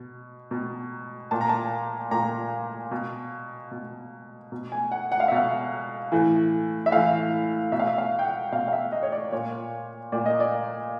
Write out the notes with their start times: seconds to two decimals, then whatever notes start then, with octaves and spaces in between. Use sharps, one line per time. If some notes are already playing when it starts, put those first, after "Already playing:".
Already playing: B2
0.51 B2
1.31 A#2 A5
1.41 A#5
1.49 A5
2.11 A#2 A#5
2.91 B2
3.71 B2
4.52 B2
4.72 G#5
4.92 F#5
5.12 F#5
5.20 F5
5.28 E5
5.32 B2 F5
6.12 A2 E3
6.86 E5
6.92 A2 E3 F5
7.72 B2 E5
7.80 F5
7.87 E5
7.98 F5
8.19 G5
8.25 F#5
8.52 B2 F5
8.68 F5
8.73 E5
8.92 D#5
9.03 C#5
9.12 D5
9.32 A#2 C#5
10.12 A#2 D5
10.26 D#5
10.40 D5